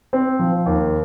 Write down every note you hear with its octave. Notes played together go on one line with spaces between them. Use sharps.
C4
F3
D#2